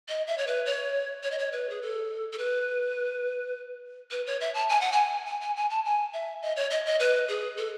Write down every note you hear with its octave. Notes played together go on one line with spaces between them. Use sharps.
D#5
E5
C#5
B4
C#5
C#5
D#5
C#5
B4
G#4
A4
A4
B4
B4
C#5
E5
A5
G#5
F#5
G#5
G#5
G#5
G#5
A5
G#5
E5
D#5
C#5
D#5
D#5
B4
G#4
A4